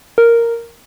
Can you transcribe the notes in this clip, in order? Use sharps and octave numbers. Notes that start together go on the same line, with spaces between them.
A#4